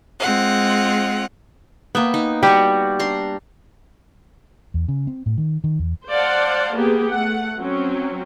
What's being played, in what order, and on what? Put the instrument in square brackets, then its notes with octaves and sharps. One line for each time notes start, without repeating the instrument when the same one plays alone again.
[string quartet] G#3 C4 F4 F#5
[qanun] A#3 E5 G5 [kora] B3
[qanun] D#4
[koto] G3 [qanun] F#4 G5 [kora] G4
[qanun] D4 A#5 C6
[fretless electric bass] E2
C#3
C4
A2
D#3
D#3
E2
[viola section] C5 D5 F5 F#5 A5
A#3 B3 G4 G#4
A3 F#5
F#3 C4 C#4